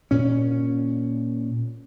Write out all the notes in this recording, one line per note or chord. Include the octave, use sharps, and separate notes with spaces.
A#2 C#4